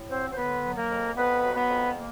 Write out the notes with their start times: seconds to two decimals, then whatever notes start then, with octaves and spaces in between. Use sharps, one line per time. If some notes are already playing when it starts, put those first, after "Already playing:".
Already playing: A2
0.10 F#3 C4 C5
0.31 C5
0.36 D3 B3 B4
0.63 F#3
0.76 A#3 A#4
0.90 F2
1.16 F2 B3 B4
1.43 F#3
1.56 B3 B4
1.69 F2
1.96 A#3